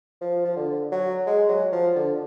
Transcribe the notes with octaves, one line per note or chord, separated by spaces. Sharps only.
F3
F3
D3
F#3
G#3
F#3
F3
D3